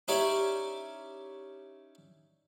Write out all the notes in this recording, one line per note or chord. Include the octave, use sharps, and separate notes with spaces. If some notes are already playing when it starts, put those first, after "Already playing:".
C#4 D#4 E4 G4 C#5 D5